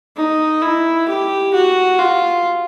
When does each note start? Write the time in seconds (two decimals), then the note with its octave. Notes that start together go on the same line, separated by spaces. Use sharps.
0.16 D#4
0.62 E4
1.08 G4
1.54 F#4
1.99 F4